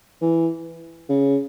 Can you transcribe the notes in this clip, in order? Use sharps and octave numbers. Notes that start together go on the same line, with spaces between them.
E3
C#3